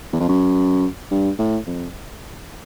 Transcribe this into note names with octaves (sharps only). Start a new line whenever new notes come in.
E2
F2
F#2
G2
A2
F2